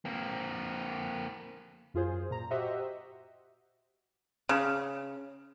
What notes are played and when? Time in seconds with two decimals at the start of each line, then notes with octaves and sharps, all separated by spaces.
0.05 A#3 C4
1.94 F#2 F4 G#4 C5
2.30 A#2 A#5
2.50 F#4 G4 C5 D#5 E5 F#5
4.49 C#3